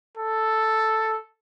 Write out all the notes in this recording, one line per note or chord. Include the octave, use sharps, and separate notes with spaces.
A4